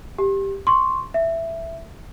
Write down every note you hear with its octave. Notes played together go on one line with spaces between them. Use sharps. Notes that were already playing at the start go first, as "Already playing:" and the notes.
G4
C6 C#6
E5